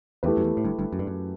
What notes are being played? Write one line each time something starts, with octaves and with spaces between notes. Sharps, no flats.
E2 A3 E4 G4 B4
F#2
E2
A2
G1 G2
G1 G2
F#2
G2
F#2